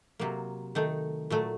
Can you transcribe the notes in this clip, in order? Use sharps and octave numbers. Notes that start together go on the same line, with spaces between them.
C3 F#3 A#3
D#3 A3 D#4
A#2 F#3 A3